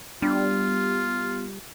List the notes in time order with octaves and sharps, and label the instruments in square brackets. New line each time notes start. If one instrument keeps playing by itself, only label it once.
[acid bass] G3 [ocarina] B3 [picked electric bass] D4 [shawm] F4